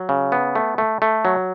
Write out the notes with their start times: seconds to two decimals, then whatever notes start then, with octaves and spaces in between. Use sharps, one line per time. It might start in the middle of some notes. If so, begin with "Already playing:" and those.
Already playing: F#3
0.09 C#3
0.32 B3
0.55 A3
0.78 A3
1.02 A3
1.25 F#3